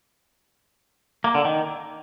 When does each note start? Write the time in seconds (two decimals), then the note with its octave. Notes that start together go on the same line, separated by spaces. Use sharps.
1.24 A#3
1.35 D3
1.45 D#3